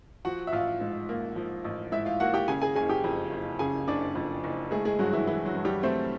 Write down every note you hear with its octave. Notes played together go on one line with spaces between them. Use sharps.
F3 F#4 F#5
E5
A1 F4 F5
G#2
A#3
F3
A1
G#2 E4 E5
F4 F5
A#3 F#4 F#5
G4 G5
C#3 G#4 G#5
G#4 G#5
F#1 G#4 G#5
G4 G5
F2
F#1
C#3 G#4 G#5
F#1 D4 D5
F2
F#1
G#3 A3 G#4
G#3 G#4
G2 F#3 F#4
E3 E4
E3 E4
F#3 F#4
G2
G3 G4
A3 C4 C5